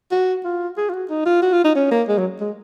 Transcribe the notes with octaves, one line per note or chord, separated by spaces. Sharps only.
F#4
F4
G#4
F4
F#4
D#4
F4
F#4
F4
D#4
C#4
A#3
G#3
F#3
G#3